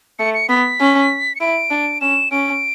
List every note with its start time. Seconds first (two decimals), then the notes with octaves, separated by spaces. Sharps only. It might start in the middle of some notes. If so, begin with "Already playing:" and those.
0.19 A3 C#7
0.34 C#7
0.49 B3 B6
0.80 C#4
1.35 C#7
1.40 E4 D7
1.71 D4
2.01 C#4 E7
2.31 C#4 D7